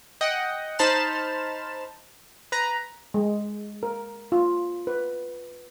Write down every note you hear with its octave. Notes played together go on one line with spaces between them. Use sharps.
D#5 F#5 G5
D#4 C5 A5 B5 F6 E7
B4 A#5
G#3
A#4
F4
B4